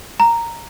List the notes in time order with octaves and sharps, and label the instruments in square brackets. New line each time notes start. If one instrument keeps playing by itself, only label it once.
[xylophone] A#5